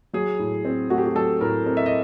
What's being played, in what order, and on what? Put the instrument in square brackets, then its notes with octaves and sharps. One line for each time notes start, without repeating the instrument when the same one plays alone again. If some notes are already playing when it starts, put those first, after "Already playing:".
[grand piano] F#3 G#4
A2
C4
A3 F#4
G4
F#4
F#3 A4
A2 A#4
C4 A#4
E5
D#5